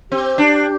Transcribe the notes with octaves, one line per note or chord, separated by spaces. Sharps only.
C4 G4
D4